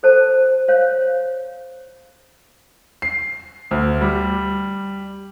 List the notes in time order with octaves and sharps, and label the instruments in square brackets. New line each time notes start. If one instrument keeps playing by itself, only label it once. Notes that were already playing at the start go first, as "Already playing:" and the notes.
[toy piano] A4 C5 A5
C5 C#5 F5
[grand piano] C7
D2
G3